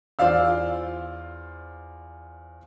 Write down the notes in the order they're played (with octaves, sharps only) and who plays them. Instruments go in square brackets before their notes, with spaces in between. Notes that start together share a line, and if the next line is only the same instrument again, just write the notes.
[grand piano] E2 F4 C5 D5 F5 E6